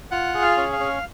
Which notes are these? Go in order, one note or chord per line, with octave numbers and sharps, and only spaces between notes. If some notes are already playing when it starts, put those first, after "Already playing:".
F4 F#5
G#4
F5
C#4
F5
C#4